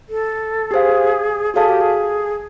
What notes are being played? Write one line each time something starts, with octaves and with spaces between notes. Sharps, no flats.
A4
G4 G#4 C5 F5
F#4 G#4 A4 C#5 F5 A5
G4
G#4